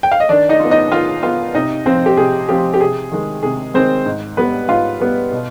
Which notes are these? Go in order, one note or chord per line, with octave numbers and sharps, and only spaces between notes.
G5
F5
D#5
D#3 D4 D5
D#4 D#5
F4
B3
D#4 D#5
D#3 F4 F5
B3 F4 F5
C3 D#4 D#5
F3 C4 F4 C5
G4
C3 G#4
F3 C4 F4 G4
G4
C3 G#4
D#3 G#3
C3 G#4
D#3 G#3 C4 C5
G#2
G3 B3 B4
G#2 F4 F5
G3 B3
B2